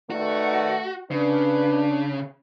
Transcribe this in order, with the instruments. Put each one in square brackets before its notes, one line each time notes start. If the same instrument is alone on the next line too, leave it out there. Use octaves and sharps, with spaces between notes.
[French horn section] D#3 B4 D5 [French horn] A3 [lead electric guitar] F#4
[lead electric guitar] C#3 [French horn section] D4 [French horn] B4